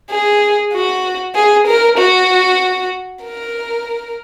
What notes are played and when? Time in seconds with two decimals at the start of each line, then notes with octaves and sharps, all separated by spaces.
0.10 G#4
0.73 F#4
1.35 G#4
1.67 A#4
1.98 F#4
3.24 A#4